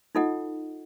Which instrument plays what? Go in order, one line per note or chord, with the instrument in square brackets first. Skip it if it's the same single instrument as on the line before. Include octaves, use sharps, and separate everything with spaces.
[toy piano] D#4 F4 A4 D#5 F#5